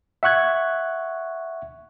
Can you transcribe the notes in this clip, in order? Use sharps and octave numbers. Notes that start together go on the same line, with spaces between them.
E5 F#5 C#6 F#6 G#6